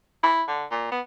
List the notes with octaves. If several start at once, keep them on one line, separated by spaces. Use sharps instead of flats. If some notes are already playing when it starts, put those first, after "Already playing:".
E4
D3
A#2
B3